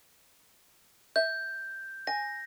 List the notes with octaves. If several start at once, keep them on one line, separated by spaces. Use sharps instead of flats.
E5 G6
G#5 A#6